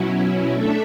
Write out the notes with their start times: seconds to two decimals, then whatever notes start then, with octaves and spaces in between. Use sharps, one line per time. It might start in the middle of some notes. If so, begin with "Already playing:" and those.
Already playing: B2 F#3 C#4 E4
0.52 A3 D4 A4 E5